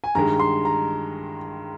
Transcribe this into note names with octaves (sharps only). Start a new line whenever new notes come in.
G#5
G2 D#3 G#3 A#5
C6
A#5